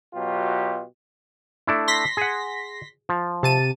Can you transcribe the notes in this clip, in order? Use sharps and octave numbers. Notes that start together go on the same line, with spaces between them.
B2 F#3 F4 G4
A3 D4 E4
C6 A#6 B6
G#4 F#5
F3
C3 A5 D#7